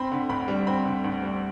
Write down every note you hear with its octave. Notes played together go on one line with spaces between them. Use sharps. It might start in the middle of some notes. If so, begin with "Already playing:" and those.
Already playing: C4 B5
D3
D2 B5
G3
C4 B5
D3
D2
G3